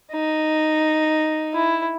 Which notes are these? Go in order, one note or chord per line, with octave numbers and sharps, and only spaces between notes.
D#4
E4